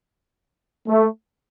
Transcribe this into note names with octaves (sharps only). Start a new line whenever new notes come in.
A3